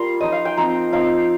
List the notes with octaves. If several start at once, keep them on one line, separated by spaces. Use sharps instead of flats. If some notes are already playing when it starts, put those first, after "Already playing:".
Already playing: G3 A#3 F4 A#5 C6
F3 D#4 D#5
F5
G5
F3 C4 D#4 A#5
F3 C4 D#4 F5